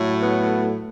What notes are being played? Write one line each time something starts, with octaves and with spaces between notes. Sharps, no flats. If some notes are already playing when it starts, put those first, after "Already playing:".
Already playing: A2 F#3 A3
B3